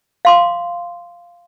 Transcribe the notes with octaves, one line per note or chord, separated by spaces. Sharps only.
F5 C6 D6